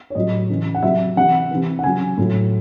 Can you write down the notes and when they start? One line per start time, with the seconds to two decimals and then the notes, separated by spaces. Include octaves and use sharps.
0.10 C#5
0.15 A2 F#3 D#5
0.50 C#3 E3
0.75 F#5
0.83 C3 F#3 E5
1.17 C3 E3 F#5
1.51 C3 E3
1.79 F#5
1.84 C#3 F#3 G#5
2.17 A2 F#3